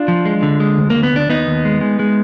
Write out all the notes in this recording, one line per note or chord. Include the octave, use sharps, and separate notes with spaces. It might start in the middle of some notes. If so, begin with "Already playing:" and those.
Already playing: D4 F4
F3
G#3
D3
G#3
D2
D2 A#3
B3
D2 D4
D#2 B3 D#4
D#2
G#3
G#3
G#3